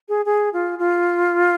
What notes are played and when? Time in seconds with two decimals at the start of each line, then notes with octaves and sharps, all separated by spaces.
0.09 G#4
0.25 G#4
0.53 F4
0.79 F4